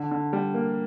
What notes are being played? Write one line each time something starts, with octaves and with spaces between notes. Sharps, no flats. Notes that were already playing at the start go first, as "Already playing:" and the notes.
Already playing: D3
D3
G3
A#3